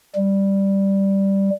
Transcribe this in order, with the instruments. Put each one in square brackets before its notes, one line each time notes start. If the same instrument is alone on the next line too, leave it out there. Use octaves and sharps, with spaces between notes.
[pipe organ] G3